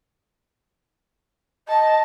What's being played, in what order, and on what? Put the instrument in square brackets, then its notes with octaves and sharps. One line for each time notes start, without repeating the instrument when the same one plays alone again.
[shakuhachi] D#5 [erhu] A5